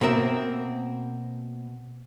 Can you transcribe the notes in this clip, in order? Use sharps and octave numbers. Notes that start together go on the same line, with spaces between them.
B2 A#3 C4 A#4 E5